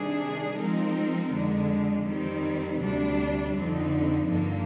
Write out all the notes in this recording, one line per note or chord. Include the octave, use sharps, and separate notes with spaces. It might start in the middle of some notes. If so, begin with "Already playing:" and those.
Already playing: C3 D#3 G3 D4 G#4
F3 G#3 C4 D#4 A#4
F2 D3 G#3
F2 D#3 G3 C4
D2 C3 G3 D4
F2 D3 F3 C4 D#4
G2 D3 F3 A#3